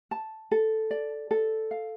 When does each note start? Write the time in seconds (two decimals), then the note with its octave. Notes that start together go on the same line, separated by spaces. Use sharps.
0.11 A5
0.51 A4
0.91 D5
1.31 A4
1.71 F5